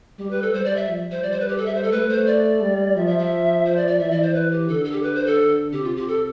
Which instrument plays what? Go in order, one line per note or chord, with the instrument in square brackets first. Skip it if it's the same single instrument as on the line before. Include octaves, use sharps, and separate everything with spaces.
[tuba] G3 [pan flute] G4
[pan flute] B4
A4
[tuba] G3 [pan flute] C5
[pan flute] D5
E5
[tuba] F3
[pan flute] C5
[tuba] G3 [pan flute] D5
[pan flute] C5
B4
G4
A4
E5
C5
A4
[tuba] A3 [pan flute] B4
[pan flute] C5
D5
[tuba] G3
[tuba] F3 [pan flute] E5
[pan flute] E5
E5
C5
D5
D5
[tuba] E3 [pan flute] E5
[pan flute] D5
C5
B4
G4
[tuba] D3 [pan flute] A4
[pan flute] A4
G4
B4
C5
A4
[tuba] C3 [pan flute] G4
[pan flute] F4
G4
A4